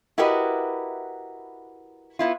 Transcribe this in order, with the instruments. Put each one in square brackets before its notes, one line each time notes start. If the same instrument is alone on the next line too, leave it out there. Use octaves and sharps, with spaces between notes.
[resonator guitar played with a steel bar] E4 F#4 G4 A#4 B4 D#5
B3 E4 F4